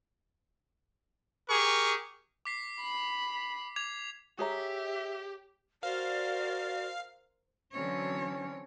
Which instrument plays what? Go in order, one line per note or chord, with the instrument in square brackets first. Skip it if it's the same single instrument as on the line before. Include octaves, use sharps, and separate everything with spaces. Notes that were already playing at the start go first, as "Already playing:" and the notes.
[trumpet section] G4 G#4 A#4 C#6
[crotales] D6 B6 C7
[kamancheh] B5
[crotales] D6 G#6 F7
[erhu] G4 [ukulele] G#4 C#5 A#5 [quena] E5
[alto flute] F#4 [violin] A#4 C5 [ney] D5 [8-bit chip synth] F5
[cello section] D3 F#3 C4 [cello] E3 C#5 [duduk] C#4